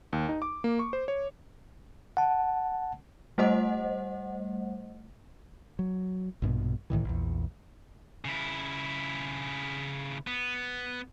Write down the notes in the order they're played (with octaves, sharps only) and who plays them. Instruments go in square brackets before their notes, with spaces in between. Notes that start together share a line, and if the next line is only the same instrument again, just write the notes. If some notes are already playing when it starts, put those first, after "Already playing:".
[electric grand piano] D#2
D#4
D6
A#3
C#6
C5
C#5
[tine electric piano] F#5 A5
[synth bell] G3 A3 C5 D#5 F#5
[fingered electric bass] F#3
A#1 G2 B2
C#2 A2 D#3 E3
A#1 E2
[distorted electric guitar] C#3 E4
B3